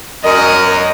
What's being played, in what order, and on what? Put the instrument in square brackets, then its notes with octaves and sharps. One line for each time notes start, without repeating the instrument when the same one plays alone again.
[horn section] F#2 [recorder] A#4 [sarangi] D#5